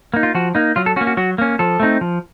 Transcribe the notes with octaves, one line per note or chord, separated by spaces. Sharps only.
A#3 D#4
F4
F3 F#4
A#3 D#4
F#3 F4
A4
A#3 C#4 F#4
F#4
F#3 F#4
A#3 C#4
F3 A4
A3 C4 D#4
F3